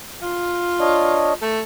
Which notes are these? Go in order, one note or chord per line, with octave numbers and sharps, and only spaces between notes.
F4
D4 C#5 D#5
A3